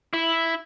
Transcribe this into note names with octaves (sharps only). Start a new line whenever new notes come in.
E4